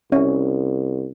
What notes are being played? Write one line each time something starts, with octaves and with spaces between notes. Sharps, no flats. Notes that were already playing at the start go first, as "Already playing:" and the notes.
C2 C#4